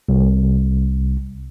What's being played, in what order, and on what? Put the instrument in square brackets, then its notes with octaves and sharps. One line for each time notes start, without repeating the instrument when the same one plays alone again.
[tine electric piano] C2